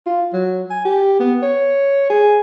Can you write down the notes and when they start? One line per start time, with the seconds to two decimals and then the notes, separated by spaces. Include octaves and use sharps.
0.06 F4
0.33 F#3
0.70 G#5
0.85 G4
1.19 B3
1.42 C#5
2.10 G#4